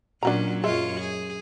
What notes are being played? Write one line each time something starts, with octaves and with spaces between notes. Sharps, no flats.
A#2 F#3 C#4 D4 F#4 A#5
F#2 G#3 F4 C#5 E5
G#4